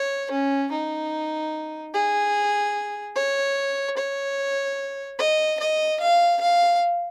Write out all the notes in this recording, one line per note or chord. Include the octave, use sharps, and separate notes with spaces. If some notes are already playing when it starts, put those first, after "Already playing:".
Already playing: C#5
C#4
D#4
G#4
C#5
C#5
D#5
D#5
F5
F5